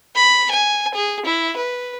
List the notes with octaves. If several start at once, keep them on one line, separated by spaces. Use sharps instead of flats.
B5
G#5
G#4
E4
B4